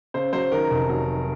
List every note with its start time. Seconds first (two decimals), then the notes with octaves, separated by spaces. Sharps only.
0.14 C#3 C5
0.33 F#3 C5
0.52 D#3 A#4
0.70 F1
0.89 F#3